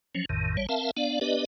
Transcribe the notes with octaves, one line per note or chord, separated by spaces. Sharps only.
F3 F#3 C#4
A1 F2 A2 D#3
A1 G3 C#5
C4 A#4 E5 F5 A5
B3 D4 D5 F5
B3 D4 G4 B4 D5 D#5